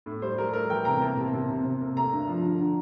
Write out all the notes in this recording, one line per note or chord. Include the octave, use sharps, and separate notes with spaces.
A2
G3 C5
G3 A#4
A3 A#4
E3 G5
C3 A#5
A#3 A5
C3
C3
C3
C3
A#3
A3 A#5
G2
F3
D3
D3